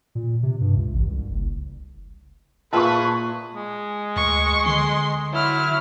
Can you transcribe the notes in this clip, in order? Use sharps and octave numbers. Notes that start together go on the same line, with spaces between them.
A#2
C3
G2
C#2
A1
C2
F#1
A#2 F4 G#4 B4 E5 A5 C#6
G#3
D2 C#6
D3 C6
F#3 E4 F6